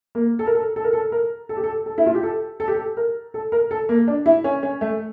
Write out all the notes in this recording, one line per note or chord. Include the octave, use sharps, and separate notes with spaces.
A#3
A4
A#4
A4
A4
A#4
A4
A#4
A4
G4
A4
A4
E4
F4
G4
A4
A4
G4
A4
A#4
A4
A#4
A4
A#3
D4
E4
C#4
C#4
A3